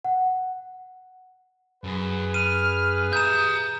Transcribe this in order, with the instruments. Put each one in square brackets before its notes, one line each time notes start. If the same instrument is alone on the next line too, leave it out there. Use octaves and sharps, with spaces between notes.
[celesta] F#5
[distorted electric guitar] F#2 [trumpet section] G#4 B4
[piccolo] F6 [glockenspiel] D#7
[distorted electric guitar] E5 A#5 [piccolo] D#6 [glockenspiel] G6 E7